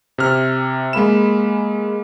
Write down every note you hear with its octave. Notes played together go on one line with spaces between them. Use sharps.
C3 F6
G#3 A#3 B5 E7